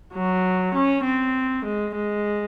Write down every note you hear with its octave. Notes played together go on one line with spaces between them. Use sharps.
F#3
C#4
C4
G#3
G#3